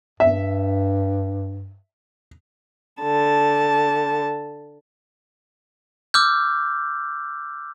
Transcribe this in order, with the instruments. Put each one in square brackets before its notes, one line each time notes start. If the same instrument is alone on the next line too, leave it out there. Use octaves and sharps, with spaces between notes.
[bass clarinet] G2 [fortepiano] E5
[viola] D3 A5
[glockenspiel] D6 E6 F6 G6